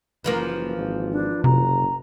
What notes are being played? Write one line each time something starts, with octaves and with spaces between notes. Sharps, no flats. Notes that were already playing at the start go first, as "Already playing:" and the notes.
F#1 E3 F3 A#3
G#1
D4
F#1 C3 A#5